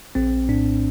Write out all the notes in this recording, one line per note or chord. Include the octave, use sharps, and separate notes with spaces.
A#1 C4
A2 D4